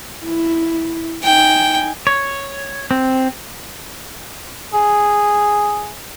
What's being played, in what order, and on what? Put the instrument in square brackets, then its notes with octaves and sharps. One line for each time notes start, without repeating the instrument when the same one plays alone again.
[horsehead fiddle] E4
[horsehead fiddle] D#4 G#5 [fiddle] G5
[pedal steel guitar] C#5
C4
[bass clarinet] G#4